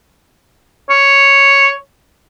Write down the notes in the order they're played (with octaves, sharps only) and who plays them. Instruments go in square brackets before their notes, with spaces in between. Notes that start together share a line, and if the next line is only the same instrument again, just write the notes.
[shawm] C#5